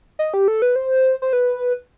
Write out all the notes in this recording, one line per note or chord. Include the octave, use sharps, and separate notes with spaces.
D#5
G4
A4
B4
C5
C5
B4